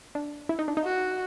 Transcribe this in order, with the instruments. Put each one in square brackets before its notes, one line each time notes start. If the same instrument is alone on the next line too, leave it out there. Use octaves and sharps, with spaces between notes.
[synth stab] D4
E4
D#4
D4
D#4
[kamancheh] F#4